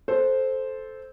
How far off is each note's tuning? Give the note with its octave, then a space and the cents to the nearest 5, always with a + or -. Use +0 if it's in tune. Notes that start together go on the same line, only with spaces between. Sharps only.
A4 -10 C5 +0